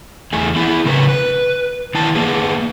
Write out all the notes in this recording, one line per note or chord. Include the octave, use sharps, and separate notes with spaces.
E2 A3 G#4
B3 E4 G#4
C#3 A#4 B4
B4
D#3 E3 A5
A#3 B3 G#4